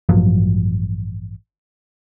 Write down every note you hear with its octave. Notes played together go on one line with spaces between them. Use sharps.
A1 G2 F3 F#3